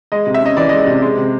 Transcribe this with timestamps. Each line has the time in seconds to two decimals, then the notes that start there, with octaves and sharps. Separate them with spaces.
0.12 G#3 D#5
0.27 C3
0.34 E5
0.42 C#4 D#5
0.57 E3 D5
0.69 G#3 D#5
0.87 C3
1.02 G#3
1.17 C3